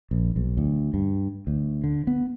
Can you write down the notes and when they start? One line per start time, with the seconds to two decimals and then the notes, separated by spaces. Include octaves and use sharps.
0.11 A#1
0.36 B1
0.57 D2
0.94 G2
1.47 D2
1.84 D3
2.07 B3